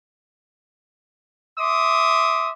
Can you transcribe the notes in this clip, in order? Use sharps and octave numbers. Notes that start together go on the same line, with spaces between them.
E5 C6 D6 D#6